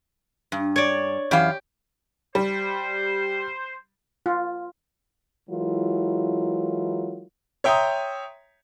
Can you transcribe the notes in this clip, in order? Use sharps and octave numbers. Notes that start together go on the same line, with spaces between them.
G2
C#5 D5
F#2 E3 G4 F5
G3 C5
F4
E3 F#3 G#3 E4 F4 A#4
C#5 E5 G5 A#5 C6 D#6